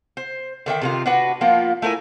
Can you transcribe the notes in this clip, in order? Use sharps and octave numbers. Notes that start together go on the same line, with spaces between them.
C5
D3 D#3 E5 G5
C3 D#3 F4
D4 F#4 B4
F3 A#3 B3 F4
A3 E4 A#4 G#5